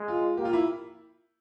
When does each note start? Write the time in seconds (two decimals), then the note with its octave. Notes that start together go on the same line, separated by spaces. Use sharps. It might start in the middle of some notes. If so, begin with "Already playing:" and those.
Already playing: G#3
0.08 F4
0.37 A#3 G4
0.45 F4
0.53 E4